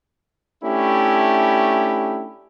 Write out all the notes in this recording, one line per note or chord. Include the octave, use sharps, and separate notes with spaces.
A3 C#4 D4 E4 G4